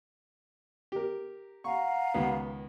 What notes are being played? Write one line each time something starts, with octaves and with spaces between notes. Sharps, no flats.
G4 A#4
F5 F#5 A#5 C#6
C#2 D#3 B3